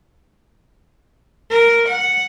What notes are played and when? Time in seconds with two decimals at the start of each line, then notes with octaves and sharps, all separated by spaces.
1.50 A#4
1.88 F#5